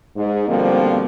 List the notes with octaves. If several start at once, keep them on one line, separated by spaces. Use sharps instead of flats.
G#2
B2 D3 F3 G3 A#3 C4